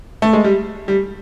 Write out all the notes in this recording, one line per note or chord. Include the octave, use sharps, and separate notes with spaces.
A3
G#3
G3
G3